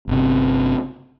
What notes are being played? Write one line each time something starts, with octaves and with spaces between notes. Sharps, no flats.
G1 C3